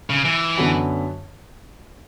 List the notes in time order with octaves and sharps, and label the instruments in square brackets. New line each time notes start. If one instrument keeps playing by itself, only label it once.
[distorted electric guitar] C#3
E3
[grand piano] F#2 D3 F#3 B3